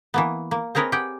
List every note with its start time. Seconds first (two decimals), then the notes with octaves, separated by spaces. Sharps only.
0.14 E3 A#3 B3
0.51 A#3
0.75 C4 G#4 A#4 B4 C#5 D#5
0.92 G4 G#4 F#5 G5